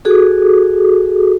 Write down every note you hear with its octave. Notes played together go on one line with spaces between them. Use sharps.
F#4 G#4 A4